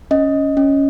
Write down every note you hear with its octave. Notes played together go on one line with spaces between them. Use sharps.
C#4 D#5
C#4